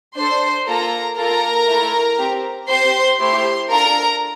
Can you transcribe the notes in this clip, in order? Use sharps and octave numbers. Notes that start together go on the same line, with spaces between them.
D4 A4 C5 C6
A#3 F4 A4 A#4 A#5
A#3 F4 A4 A#4 A#5
A3 E4 A4
C4 G4
C4 G4 C5 C6
A3 E4 G4 C5 C6
D4 F4 A4 A#4 A#5